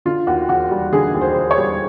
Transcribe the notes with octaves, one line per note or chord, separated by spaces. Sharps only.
D3 F4
D#2 F#4
E1 F#4
G3
D3 G#4
D#2
C5
E1
C#5
G3